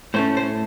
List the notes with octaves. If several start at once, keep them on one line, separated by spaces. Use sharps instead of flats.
A2 A3 C#4 C5
C5